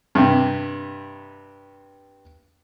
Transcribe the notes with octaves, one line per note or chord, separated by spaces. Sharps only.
G2 C3